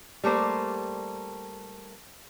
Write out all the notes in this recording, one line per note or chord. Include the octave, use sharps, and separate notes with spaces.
G3 A3 A#3 C5